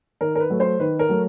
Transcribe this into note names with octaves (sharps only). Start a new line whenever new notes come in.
D#3 A#4
A#4
B4
F#3 A3
C5
D#3 B4
A#4
F#3 A3